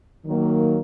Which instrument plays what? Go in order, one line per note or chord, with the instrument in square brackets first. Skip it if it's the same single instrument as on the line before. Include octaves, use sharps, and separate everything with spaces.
[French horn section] D#3 F#3 A#3